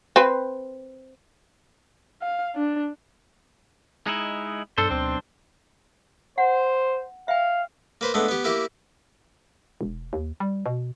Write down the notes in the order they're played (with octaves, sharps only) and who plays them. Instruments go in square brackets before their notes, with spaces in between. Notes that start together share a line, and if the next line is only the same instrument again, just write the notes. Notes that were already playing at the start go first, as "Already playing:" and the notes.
[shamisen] C4 B4
[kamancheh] F5
D4
[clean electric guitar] G#3 D#4 E4
[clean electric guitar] B1 D4 C5 [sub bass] G2 [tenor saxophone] A4
[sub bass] D2 [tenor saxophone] C4
[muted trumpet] C5 [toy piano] F#5
[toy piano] E5 G5 [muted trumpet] F5
[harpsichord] A#3 B4 C5
G#3 A3 B3 D4
B3 G4
A#3 E4 G4
[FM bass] E1
D#2
G3
B2